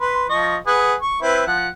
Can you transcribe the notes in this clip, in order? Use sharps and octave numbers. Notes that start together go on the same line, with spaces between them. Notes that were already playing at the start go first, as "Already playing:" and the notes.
B4 C6
F3 D#5 C#6
G#4 B4 F#5
C#6
C4 E4 B4
F3 F#5